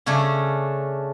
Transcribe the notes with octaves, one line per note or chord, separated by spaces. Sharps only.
C#3 A3 C#4 D4